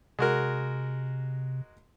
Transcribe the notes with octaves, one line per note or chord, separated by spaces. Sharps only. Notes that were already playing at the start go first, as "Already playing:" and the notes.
C3 G#3 F#4 A#4